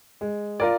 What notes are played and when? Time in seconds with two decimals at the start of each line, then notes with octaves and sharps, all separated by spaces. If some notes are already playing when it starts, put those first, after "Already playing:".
0.21 G#3
0.60 F4 A#4 D5